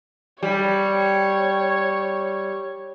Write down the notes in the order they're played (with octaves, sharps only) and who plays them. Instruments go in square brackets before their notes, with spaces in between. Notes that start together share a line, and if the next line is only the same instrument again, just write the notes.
[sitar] G3 [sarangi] C#5